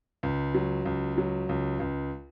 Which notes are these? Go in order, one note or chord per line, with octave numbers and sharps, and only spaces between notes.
C#2
F#3
C#2
F#3
C#2
C#2